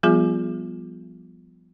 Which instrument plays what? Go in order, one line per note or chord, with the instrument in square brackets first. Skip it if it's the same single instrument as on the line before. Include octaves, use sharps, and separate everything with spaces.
[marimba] F3 G3 B3 F4 G#4